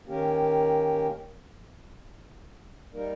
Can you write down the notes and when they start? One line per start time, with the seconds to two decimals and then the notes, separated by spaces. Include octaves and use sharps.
0.06 D#3 A#3 C#4 G4 A#4
2.94 G3 A#3 D#4 A#4